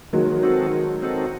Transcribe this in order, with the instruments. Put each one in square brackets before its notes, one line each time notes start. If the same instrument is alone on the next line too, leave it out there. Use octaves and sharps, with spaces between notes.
[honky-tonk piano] D#3 F#3 [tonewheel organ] G#3
[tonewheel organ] C4 D#4 F#4 A4
G#3
C4 D#4 F#4 A4